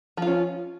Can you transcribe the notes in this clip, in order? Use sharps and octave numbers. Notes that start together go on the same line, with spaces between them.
F3 C#4 F4